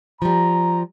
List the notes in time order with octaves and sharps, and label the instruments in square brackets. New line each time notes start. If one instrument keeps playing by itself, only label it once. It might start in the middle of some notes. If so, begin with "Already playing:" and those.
[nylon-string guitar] F3 G3 [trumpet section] A#5